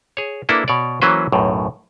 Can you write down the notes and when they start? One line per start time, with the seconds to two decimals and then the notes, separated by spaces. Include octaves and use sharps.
0.17 G#4 C#5
0.49 A#3 D4 E4 A4 B4
0.68 B2 C#5 D5
1.02 E3 F#3 A#3 C#4 B4 C5
1.32 B1 F#2 A2